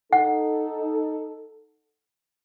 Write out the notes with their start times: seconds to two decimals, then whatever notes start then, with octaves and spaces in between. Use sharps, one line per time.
0.13 D#4 A4 F#5